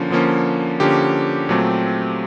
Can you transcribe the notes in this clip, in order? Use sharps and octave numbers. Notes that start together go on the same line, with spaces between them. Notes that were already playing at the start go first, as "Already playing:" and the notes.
Already playing: D3 F3 A#3 C#4
D3 F3 A#3 C#4
D3 F3 A#3 C#4 G4
A#2 F#3 A3 C4